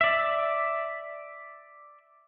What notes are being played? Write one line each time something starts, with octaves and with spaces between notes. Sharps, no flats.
D5 E5